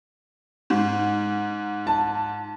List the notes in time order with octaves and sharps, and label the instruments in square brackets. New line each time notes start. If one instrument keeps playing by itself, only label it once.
[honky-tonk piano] G#2
[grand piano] A5